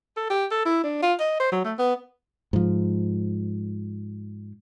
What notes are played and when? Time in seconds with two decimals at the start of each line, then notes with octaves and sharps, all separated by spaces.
0.17 A4
0.30 G4
0.51 A4
0.66 E4
0.84 D4
1.02 F4
1.20 D#5
1.40 C5
1.52 F#3
1.65 A3
1.79 B3
2.53 G#2 F3